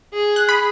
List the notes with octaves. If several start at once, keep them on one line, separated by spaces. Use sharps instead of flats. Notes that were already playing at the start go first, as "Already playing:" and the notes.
G#4
F#6
B5